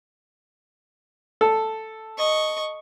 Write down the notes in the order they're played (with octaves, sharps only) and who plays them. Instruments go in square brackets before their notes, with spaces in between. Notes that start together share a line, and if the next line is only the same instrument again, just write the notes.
[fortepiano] A4
[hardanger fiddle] D#5 C#6